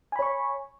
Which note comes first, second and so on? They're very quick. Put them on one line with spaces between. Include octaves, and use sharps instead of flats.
G#5 B5 C#5 C#6